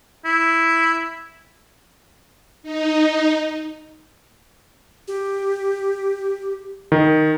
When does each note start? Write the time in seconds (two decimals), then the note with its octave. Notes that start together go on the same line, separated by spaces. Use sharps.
0.25 E4
2.63 D#4
5.08 G4
6.92 D#3